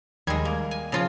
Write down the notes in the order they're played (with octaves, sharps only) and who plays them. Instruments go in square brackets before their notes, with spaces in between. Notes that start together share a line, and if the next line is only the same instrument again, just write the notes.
[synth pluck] D#2 G#6 [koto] G3 G#3
[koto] A#3
G#5
C#3 F3 F4